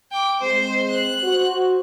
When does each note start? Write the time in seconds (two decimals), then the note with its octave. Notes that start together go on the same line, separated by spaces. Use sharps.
0.12 G5 D6
0.41 G#3 C4 C5
0.90 F#6
1.23 F#4 C5